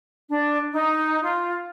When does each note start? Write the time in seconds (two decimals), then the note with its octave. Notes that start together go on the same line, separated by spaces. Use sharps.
0.29 D4
0.73 D#4
1.23 F4